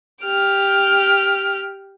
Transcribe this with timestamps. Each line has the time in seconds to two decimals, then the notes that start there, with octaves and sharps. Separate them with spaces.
0.24 G4 F6